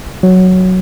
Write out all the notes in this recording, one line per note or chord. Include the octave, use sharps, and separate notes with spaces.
F#3